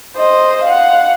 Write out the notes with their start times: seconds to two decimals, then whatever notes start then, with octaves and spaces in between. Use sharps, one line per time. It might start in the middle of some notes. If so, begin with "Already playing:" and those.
0.16 C5 D#5
0.64 F5 F#5